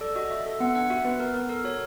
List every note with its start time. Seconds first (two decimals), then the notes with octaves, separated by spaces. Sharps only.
0.01 A4 D5
0.15 F#4 D#5
0.30 F#4 E5
0.46 A4 E5
0.60 B3 F#5
0.75 D4 F#5
0.90 F#4 E5
1.04 B3 B4
1.20 B3 A#4
1.34 B3 A#4
1.49 A4 A#4
1.64 F#4 C#5